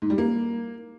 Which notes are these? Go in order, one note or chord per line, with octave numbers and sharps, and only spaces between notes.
G#2
G3
A#3